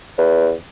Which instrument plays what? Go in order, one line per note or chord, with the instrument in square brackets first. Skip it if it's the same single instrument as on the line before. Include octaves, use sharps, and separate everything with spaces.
[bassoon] E2